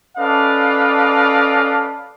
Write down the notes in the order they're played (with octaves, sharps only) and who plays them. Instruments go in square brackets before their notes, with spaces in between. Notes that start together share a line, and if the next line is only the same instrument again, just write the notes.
[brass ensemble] C#4 A4 B4 D5 D#5 F5